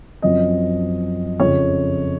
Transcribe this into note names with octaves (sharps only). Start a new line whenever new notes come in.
F#2 F3 C4 D#5
F2 C#3 F3 C#5